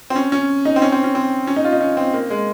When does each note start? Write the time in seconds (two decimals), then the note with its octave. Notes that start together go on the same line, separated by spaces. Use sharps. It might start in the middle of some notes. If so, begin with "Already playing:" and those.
0.10 C4
0.16 C#4
0.32 C#4
0.65 D#4
0.76 C4
0.82 C#4
0.92 C4
1.04 C#4
1.15 C4
1.47 C#4
1.56 D#4
1.64 F4
1.73 D#4
1.81 C#4
1.97 C4
2.14 A#3
2.30 G#3